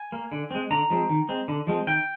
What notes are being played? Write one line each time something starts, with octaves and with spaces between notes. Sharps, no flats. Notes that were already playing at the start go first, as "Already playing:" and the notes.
Already playing: G#5
A#3
D3
G#3 C4
D3 A#5
F3 G#3 C4
D#3
G#3 C4
D3
F3 G#3 C4
D#3 G5